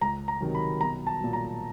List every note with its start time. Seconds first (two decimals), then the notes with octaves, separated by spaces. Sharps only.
0.01 C#2 A#5
0.28 A#5
0.41 C3 D#3 F#3
0.55 B5
0.81 B1 A#5
1.07 A5
1.20 A#2 F#3
1.33 A#5